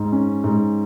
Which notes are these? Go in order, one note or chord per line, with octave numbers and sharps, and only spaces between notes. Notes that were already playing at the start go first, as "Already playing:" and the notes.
Already playing: G#2
C#4
G#2